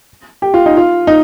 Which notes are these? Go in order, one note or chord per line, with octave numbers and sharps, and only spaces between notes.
G4
F4
D#4
F4
D#4